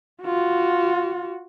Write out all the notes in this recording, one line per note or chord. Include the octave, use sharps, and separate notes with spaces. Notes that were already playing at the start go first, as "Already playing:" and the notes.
F4 F#4